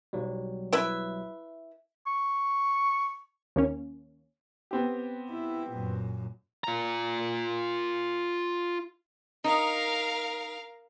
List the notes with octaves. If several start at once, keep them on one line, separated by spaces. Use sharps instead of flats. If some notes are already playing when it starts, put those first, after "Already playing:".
B1 F#3 G3
E4 B4 E5
C#6
D#2 A#3 C#4
B3 C4 G4
E4
F#2 A#2
F4 A#5
D#4 A#4 F5